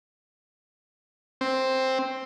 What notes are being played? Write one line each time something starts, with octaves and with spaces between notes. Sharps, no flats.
C4